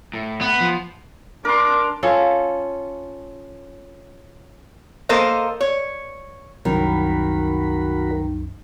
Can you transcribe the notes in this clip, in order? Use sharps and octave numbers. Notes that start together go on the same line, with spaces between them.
A2
B3
F3
D4 A#4 C6 D6
C#4 F4 A4
A#3 A4 A#4 C5 D#5
C#5
C2 F#2 D#3 F#4 A#4 B5